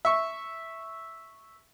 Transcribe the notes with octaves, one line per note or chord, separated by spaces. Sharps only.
E5 C#6